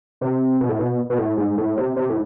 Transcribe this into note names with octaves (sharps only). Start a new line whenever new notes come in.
C3
B2
A2
B2
B2
A2
G#2
A2
C3
C3
A2